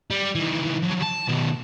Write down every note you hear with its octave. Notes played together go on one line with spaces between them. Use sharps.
G3
D#3 E3
F3 F#3
A5
B2 D#3